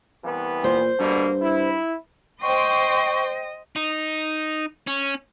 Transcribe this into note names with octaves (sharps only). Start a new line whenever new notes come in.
C2 E3 B3
A#2 C5
G2 B2 D3 A#3
E4
C5 D#5 G5 C6 C#6
D#4
C#4